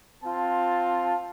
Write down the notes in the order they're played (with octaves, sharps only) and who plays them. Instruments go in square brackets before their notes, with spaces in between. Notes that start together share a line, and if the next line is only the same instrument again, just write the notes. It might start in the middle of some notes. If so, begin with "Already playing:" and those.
[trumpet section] C4 F4 A5